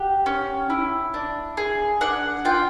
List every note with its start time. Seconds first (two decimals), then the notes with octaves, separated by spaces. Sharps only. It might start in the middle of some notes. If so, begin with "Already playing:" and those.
Already playing: G4 F#5
0.26 C#4
0.70 E4
1.14 D4
1.57 G#4
2.01 D4 F#5
2.45 F4 G5